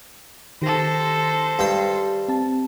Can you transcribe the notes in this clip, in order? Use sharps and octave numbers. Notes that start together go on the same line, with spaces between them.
D#3 G4 A4 C5 A#6
G2 G5
C4 A5